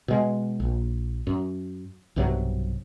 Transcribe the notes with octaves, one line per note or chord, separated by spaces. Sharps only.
B2 G#3
A#1
F#2
B1 G2 C3 F#3